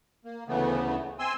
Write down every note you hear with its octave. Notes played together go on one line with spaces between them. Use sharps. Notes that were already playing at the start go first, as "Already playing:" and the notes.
A#3
D2 C#3 E3 A3 B3
C4 G#5 C6 E6